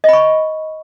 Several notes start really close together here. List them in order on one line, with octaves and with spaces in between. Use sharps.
D#5 B5 C#6